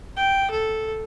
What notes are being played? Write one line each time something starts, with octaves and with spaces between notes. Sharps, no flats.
G5
A4